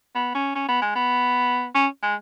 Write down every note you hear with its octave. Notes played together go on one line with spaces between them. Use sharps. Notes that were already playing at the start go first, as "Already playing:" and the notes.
B3
C#4
C#4
B3
G#3
B3
C#4
G#3